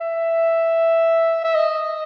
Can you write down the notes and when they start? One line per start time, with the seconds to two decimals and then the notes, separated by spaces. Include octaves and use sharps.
0.01 E5
1.44 E5
1.55 D#5